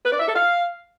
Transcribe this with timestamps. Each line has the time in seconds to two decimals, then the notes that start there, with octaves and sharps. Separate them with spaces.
0.04 B4
0.12 D5
0.20 E5
0.28 A4
0.35 F5